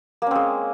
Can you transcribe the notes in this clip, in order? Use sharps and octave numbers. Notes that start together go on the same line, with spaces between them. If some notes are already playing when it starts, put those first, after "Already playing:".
G#3 A#3 C4 C#4